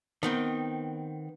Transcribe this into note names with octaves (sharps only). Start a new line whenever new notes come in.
D#3 B3 C4